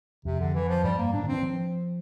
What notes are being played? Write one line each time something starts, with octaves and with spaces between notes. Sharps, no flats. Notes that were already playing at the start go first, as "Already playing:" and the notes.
F2 C3
D3
E3
F3
G2 G3
A#3
A2 D4
D3
E3 C4
F3